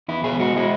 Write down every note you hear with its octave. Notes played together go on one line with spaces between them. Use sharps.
E2 E4
B2 G#4
G#3 F#4
G#3 E4